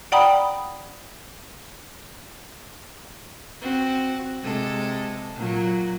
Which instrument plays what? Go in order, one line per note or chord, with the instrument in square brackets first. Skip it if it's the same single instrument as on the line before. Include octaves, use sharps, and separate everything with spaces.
[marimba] D5 F#5 G5 A#5 B5 D#6
[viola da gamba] C4 F#4
C3 G#3 A4
A#2 F#3